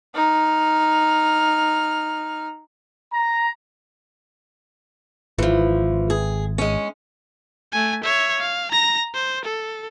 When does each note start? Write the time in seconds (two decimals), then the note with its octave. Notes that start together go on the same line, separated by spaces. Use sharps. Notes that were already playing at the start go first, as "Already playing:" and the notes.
0.15 D#4 F6
3.12 A#5
5.38 G#1 E3 F3
6.10 G#4
6.58 G#3 C#4
7.72 A3 G#5
8.04 C#5 E5
8.40 F5
8.71 A#5 A#6
9.14 C5
9.45 A4